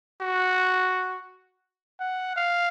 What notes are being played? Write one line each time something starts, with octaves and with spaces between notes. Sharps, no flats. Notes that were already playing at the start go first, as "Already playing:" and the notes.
F#4
F#5
F5